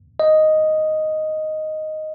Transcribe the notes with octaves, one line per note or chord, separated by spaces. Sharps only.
D#5